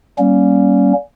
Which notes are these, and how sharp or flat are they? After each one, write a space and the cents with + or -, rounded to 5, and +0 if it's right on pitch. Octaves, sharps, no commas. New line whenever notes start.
G3 -30 A#3 +20 C#4 +0